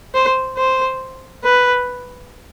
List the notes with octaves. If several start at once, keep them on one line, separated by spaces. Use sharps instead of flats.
C5
C5
B4